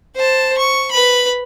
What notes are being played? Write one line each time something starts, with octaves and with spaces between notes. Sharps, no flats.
C5 A5
C#6
B4 B5